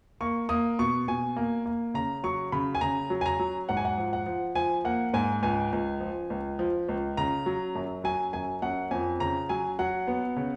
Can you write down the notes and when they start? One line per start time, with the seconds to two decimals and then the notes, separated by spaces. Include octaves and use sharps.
0.21 A#3 C#6
0.49 A#3 D#6
0.79 B2 C#6
1.08 B2 G#5
1.36 A#3
1.66 A#3
1.94 C#3 A#5
2.23 F#3 C#6
2.52 C#3 B5
2.75 G#5
2.81 C#3 A#5
3.10 F#3
3.21 G#5
3.26 A#5
3.39 F#3
3.69 G#2 F#5
3.77 G#5
3.85 F#5
3.98 F3
4.13 F#5
4.26 F3
4.55 F3 G#5
4.85 A#3 F#5
5.14 G#2 G#5
5.43 C#2 G#5
5.73 C#2
6.01 F3
6.30 C#2
6.59 F3
6.89 C#2
7.17 C#3 A#5
7.46 F#3
7.75 F#2
8.04 F#3 G#5
8.33 F#2 G#5
8.62 F#2 F#5
8.91 F2 G#5
9.20 C#3 A#5
9.49 F#3 G#5
9.79 F#3 F#5
10.08 B3
10.36 C#3